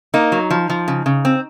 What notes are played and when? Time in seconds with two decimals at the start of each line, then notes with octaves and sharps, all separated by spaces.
0.14 A#3 D#4
0.32 F#3
0.50 F3
0.70 F3
0.88 C#3
1.06 C#3
1.25 C4